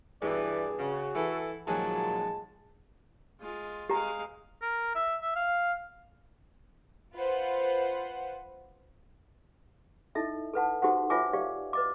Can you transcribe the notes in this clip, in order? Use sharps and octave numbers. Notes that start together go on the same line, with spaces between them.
E2 G2 B2 E3 G#4 D5
C#3 F#4
E3 E4 A4
D#2 A#2 F3 F#3 G#3 G#4 A5
G#3 F4
G#3 G4 F5 A#5
A#4
E5
E5
F5
F4 B4 C5 F#5
D#4 E4 A4 D#5 E5
A4 B4 F#5 A5
D#4 F#4 G4 A4 C5 F#5
F4 B4 C#5 E5 G#5 D6
G4 D5 F5
B4 D#5 D6